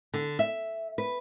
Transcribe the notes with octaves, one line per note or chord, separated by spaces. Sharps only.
D3
E5
B4